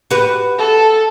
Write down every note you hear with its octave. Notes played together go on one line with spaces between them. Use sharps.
F#4 G4 B4
A4